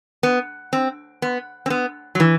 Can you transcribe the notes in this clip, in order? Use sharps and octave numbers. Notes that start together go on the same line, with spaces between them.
B3
C4
B3
C4
B3
F#3
E3